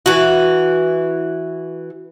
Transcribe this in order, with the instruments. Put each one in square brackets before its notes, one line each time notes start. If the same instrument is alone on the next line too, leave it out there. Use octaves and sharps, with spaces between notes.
[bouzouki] E3 F#4